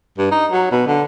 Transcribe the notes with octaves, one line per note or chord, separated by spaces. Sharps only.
G2
D#4
F#3
B2
D3